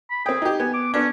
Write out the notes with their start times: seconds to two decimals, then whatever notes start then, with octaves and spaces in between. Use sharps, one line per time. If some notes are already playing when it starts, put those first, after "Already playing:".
0.11 B5
0.26 C4 G#4 G5
0.42 D#4 G4
0.60 B3 G#5
0.74 D6
0.94 B3 C#4 D4